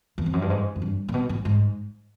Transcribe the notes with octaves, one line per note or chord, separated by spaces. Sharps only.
E2
F2
F#2
G2
G#2
F#2
G2
A#2
B2
A2
G#2